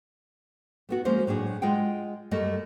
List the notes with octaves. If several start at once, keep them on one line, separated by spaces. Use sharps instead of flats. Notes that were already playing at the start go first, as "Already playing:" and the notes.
A3 B3 F#4
F3 G#3 A#3 C#4 C5
A2 F#3 D4 G#4
G#3 F4 G#4 F#5 G5
F#2 G3 A3 A#4 D#5